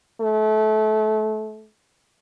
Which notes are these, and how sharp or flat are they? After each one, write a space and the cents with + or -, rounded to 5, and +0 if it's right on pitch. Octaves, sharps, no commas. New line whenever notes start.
A3 -25